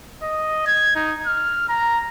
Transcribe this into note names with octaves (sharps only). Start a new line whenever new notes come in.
D#5
G#6
D#4
F6
A#5